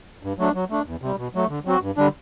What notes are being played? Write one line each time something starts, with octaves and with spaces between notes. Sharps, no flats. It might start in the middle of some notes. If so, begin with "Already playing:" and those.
G2
F#3 A3 D4
F#3
A3 D4
E2
C3 G3
B2
F#3 A3
D3
F#3 C4 F#4
G2
D3 G3 D4